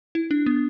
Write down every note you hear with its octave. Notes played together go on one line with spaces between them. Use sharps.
E4
D4
B3